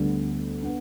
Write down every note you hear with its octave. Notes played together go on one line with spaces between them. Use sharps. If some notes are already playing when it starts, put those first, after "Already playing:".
Already playing: D2 D3 G3 B3
B3 D4